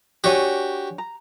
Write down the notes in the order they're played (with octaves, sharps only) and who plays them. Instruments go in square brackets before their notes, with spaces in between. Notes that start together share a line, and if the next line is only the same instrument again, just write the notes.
[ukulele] D4 C#5 G#5 [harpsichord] F#4 G4
[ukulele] A#5